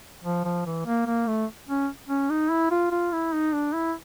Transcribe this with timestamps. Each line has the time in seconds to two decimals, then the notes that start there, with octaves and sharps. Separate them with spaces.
0.24 F3
0.45 F3
0.66 E3
0.86 A#3
1.06 A#3
1.27 A3
1.68 C#4
2.09 C#4
2.30 D#4
2.50 E4
2.71 F4
2.92 F4
3.12 E4
3.33 D#4
3.53 D4
3.74 E4